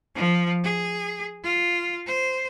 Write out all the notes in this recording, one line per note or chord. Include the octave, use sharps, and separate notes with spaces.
F3
G#4
F4
C5